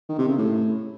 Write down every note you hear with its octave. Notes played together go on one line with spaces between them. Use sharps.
D#3
C3
C#3
A2